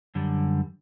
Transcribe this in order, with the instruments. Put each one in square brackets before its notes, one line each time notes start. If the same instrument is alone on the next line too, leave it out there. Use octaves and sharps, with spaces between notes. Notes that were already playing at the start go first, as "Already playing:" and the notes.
[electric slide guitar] F#2 D3 G3